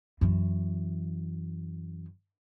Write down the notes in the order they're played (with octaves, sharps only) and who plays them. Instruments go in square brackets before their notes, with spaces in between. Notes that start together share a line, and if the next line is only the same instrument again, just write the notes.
[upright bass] F#2 E3